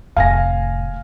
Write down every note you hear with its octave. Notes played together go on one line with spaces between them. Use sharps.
F1 A2 F5 G#5 A#6